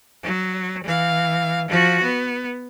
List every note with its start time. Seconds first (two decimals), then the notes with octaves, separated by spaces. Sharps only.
0.23 F#3
0.84 E3 F5
1.68 F3 F#4
2.03 B3